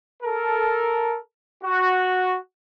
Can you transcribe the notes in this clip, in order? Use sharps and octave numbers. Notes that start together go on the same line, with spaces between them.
A4 A#4
F#4